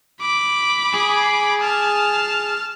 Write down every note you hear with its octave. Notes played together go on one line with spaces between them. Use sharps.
B5 D6
G#4
A5 F6